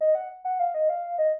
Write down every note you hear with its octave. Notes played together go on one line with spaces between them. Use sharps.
D#5
F#5
F#5
F5
D#5
F5
D#5